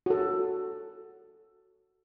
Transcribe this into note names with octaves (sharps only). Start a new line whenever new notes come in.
F#4 A4